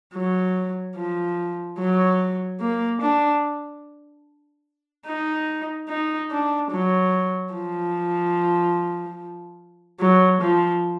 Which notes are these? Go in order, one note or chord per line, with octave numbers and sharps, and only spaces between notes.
F#3
F3
F#3
A#3
D4
D#4
D#4
D4
F#3
F3
F#3
F3